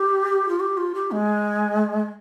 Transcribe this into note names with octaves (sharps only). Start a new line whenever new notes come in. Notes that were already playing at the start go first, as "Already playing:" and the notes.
Already playing: G4
F4
G4
F4
G4
G#3